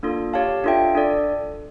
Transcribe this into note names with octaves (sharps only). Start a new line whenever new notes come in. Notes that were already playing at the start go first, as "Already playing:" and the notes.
A#3 D4 F4 A4
G4 C#5 F5 A5
D4 F4 A4 E5 G5
D4 A4 D5